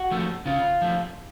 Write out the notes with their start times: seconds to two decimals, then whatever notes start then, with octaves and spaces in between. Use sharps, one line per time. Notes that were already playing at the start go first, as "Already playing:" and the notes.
Already playing: F#4
0.12 F3 A3
0.46 C#3 F4
0.81 F3 A3